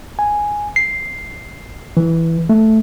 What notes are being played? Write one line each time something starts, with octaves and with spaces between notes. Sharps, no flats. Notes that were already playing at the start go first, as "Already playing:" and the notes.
G#5
C7
E3
A3